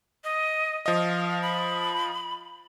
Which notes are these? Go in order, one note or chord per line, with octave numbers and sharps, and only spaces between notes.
D#5
F3 D#5 F5
B5